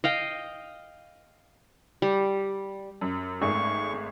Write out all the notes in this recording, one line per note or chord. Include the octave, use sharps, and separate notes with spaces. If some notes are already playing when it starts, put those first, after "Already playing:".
D#5 F5 G5
G3
F#2
G#1 G#3 A3 C#6